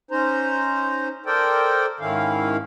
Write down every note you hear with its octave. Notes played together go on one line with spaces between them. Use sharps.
C#4 D#4 C5 A#5
A4 A#4 C5 D5 G5
G#2 D#3 C#4 E4 F5